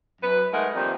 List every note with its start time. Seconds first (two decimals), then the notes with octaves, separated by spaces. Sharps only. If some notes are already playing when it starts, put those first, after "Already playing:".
0.22 F#2 B4
0.52 G#3 A3 D#4 A#4 F#5
0.74 D#3 F3 G3 A#3 C4